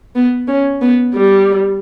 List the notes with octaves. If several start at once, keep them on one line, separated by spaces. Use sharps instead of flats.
B3
C#4
B3
G3